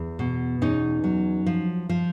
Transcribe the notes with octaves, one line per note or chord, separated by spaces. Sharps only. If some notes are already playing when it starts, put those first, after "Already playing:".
Already playing: E2
B2
E2 C#4 D#4
F#3
F3
F3